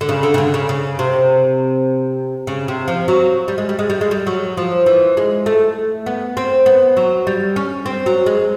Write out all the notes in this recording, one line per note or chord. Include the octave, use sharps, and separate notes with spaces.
D3
C#3
D3
C#3
D3
C#3
C#3
C3
C#3
C3
F3
F#3
G3
G#3
G3
G#3
G3
G#3
G3
F#3
F3
E3
G#3
A3
B3
C4
B3
F#3
G3
C#4
C4
F#3
G#3